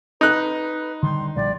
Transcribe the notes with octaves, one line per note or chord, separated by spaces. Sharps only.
D#4 B4 F#6
D3 D#3 G3 C6
A#1 G3 D5